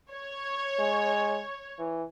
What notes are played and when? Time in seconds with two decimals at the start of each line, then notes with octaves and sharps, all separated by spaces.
0.13 C#5
0.79 G#3
1.79 E3